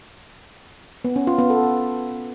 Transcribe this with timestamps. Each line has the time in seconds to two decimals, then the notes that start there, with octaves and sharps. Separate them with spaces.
1.05 B3
1.16 C#4
1.27 F4
1.39 B3
1.50 A4